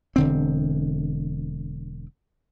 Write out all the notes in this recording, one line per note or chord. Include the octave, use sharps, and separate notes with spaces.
E1 D3 C4